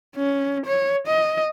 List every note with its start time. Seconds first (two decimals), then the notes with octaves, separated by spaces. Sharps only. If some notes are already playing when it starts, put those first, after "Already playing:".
0.16 C#4
0.66 C#5
1.07 D#5